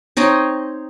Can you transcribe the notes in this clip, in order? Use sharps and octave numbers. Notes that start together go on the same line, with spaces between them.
C4 D#4 C#5 D#5